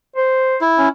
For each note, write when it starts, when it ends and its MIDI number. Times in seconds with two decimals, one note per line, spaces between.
0.16 0.57 72
0.61 0.89 64
0.78 0.88 61